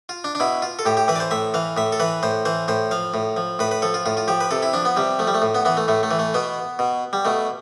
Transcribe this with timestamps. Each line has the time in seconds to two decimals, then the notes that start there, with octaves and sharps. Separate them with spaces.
0.09 F4
0.24 D4
0.35 D4
0.40 B2 E4
0.62 F4
0.79 A4
0.86 A2 G4
0.97 G4
1.08 E3 B4
1.16 D5
1.20 C5
1.31 A2 E5
1.54 E3 F5
1.77 A2 E5
1.92 A4
2.00 E3 B4
2.23 A2 C5
2.45 E3 C5
2.68 A2 C5
2.91 F3 F5
3.14 A2
3.37 F3
3.59 A2 B4
3.71 B4
3.82 F3 A4
3.94 F4
4.06 A2 F4
4.17 F4
4.28 F3 G4
4.40 B4
4.51 C3 A4
4.62 E4
4.73 F3 D4
4.85 B3
4.97 C3 G3
5.19 F3 A3
5.27 G3
5.34 A3
5.42 A2
5.55 B3
5.65 E3 B3
5.77 A3
5.88 A2 A3
6.03 A3
6.11 E3
6.19 A3
6.34 B2 B3
6.79 B2
7.13 G3
7.25 B2 A3